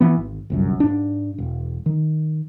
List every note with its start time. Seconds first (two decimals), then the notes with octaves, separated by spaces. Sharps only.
0.01 E3 B3
0.17 G#1
0.50 G1 C2 F#2
0.80 G#2 D4
1.38 E1
1.86 D#3